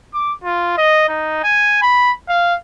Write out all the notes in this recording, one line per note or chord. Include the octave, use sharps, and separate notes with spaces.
D6
F4
D#5
D#4
G#5
B5
F5